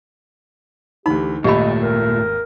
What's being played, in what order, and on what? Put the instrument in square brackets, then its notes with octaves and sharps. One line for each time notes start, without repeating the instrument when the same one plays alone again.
[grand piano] D2 E3 B5 [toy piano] D#4 [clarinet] G4
[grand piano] G#1 D#2 [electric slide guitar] A#2 A3 [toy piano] G4 B5 [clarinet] D#5
[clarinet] A#4